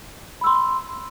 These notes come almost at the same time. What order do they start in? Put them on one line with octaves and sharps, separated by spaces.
B5 E6 C6